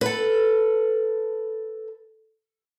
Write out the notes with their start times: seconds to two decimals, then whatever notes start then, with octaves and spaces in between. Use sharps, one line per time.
0.01 A4 B4